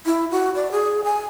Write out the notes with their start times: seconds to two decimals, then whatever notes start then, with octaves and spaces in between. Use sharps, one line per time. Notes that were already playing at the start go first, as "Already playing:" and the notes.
0.06 E4
0.31 F#4
0.55 D5
0.71 G#4
1.04 G#5